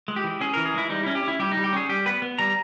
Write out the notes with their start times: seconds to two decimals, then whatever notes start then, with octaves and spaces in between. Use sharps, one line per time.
0.08 G#3
0.16 G4
0.24 E3
0.41 C#4 G#4
0.54 E3 A#4
0.66 G#4
0.74 G#3 E4
0.90 G3 D#4
1.03 C#4 E4
1.15 G4
1.23 C#4 E4
1.39 G3 G4
1.52 D#4
1.57 G3
1.64 G4
1.73 C#4 G#4
1.89 G3 G4
2.06 B3 B4
2.22 B3
2.38 G3 A#5